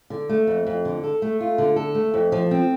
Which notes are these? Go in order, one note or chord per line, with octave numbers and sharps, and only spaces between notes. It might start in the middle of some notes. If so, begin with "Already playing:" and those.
D3
A3
F2
F2
D3
A4
A3
F4
D3
A4
A3
F2
F3
C4